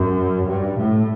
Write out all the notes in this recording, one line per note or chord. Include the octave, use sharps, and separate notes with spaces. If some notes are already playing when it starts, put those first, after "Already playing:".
Already playing: F#2
G2
A2